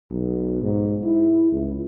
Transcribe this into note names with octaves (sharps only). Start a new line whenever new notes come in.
B1
G#2
E4
C#2